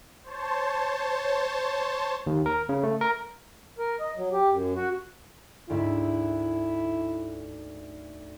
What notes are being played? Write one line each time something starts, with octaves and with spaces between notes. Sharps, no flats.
C5 C#5 A5
D#2
A#4
C#3
A3
A#4
A#4
D#5
F#3
G4
F#2
F#4
D2 G#2 E4 E5